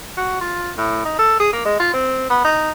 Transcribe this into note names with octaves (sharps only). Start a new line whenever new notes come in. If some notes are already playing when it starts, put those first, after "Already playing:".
F#4
F4
A2
D#4
A4
G#4
A#3
G#3
F4
C4
B3
D#4